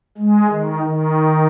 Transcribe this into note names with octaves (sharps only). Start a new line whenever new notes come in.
G#3
D#3
D#3